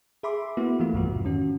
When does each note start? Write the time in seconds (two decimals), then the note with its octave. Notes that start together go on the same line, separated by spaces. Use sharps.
0.23 G#4 E5 B5 C6 D6
0.57 A#3 B3 E4 F#4
0.80 E3 F3 A3 F4
0.93 B1 G2 E3 F3 F#4
1.06 F2 G#2 C3
1.25 D#3 C#4 F#4